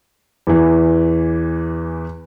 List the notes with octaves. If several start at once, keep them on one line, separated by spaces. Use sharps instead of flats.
E2 E3